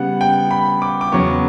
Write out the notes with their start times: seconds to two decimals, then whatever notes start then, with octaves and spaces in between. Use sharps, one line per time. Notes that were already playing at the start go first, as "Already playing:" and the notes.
Already playing: C#3 G3 B3 F#5
0.21 G5
0.51 B5
0.82 D6
1.01 D6
1.12 E2 C#3 F#3 B3 C#6